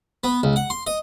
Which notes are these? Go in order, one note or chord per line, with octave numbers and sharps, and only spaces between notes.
B3
C#2
F#5
C6
D#5